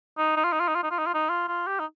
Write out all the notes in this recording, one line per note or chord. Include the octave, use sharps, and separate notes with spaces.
D#4
D#4
F4
D#4
F4
D#4
F4
D#4
F4
D#4
F4
D#4
F4
F4
G4
D#4